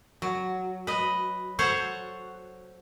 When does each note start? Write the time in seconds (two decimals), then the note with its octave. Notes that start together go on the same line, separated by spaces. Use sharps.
0.22 F#3
0.87 B4 D#5
1.59 A4 C5 C#5 F#5